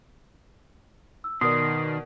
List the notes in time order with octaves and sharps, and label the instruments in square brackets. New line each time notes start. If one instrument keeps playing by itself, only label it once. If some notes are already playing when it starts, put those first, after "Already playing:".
[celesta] E6
[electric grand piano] B2 A#4 D5 [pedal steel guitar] D#3 C6 [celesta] D#6